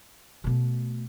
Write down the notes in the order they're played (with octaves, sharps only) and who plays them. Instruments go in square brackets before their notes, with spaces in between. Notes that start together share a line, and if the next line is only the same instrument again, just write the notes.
[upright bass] B2 A3